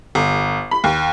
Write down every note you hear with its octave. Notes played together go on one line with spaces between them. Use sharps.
G1
B5
D#2